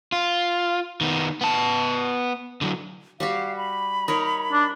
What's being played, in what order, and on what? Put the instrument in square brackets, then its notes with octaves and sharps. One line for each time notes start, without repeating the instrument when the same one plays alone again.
[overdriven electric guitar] F4
D#3 B3
B3 A5
D3 F#3
[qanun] G3 F#4 G4 [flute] F5
[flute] B5
[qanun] D#4 A#4 C#5
[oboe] D4